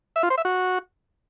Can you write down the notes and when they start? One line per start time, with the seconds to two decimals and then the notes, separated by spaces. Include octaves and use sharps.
0.16 E5
0.23 F4
0.30 C5
0.38 E5
0.45 F#4